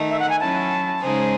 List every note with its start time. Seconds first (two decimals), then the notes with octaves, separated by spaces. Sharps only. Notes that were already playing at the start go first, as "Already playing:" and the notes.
Already playing: D#3 A3 D#4
0.10 E5
0.19 F#5
0.29 G#5
0.40 F#3 C#4 E4 A5
1.00 C#3 G#3 D#4 G#4 C5